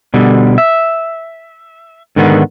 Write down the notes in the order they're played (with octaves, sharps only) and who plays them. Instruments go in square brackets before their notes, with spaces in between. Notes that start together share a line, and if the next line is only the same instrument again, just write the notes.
[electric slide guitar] B2 D3 G3
E5
G#2 D3 D#3 B3